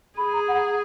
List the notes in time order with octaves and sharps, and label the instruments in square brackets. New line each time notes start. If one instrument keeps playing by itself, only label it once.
[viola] G#4 [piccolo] B5
[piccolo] A#5
F#5